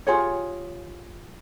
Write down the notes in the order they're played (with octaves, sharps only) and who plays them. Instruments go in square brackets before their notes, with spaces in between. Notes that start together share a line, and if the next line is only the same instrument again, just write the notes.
[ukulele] F4 G4 G#4 C#5